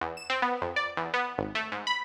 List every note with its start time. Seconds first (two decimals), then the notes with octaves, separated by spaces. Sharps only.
0.01 E2
0.17 E7
0.30 C4
0.42 B3
0.62 F2
0.76 D5
0.97 E2
1.14 B3
1.38 G#1
1.55 A3
1.72 G#2
1.87 B5